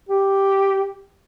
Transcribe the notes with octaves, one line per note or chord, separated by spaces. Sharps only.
G4